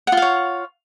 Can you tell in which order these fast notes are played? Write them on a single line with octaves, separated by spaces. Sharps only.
F#5 F4 F5 C#5